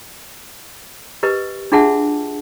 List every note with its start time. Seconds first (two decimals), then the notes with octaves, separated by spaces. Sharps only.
1.23 G4 A#4 B4 D#5
1.72 D4 F4 G#4 E5 F#5 A5